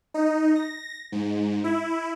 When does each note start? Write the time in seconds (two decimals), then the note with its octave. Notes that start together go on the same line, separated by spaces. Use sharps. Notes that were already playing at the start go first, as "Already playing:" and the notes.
0.14 D#4
0.55 A#6
1.12 G#2
1.64 E4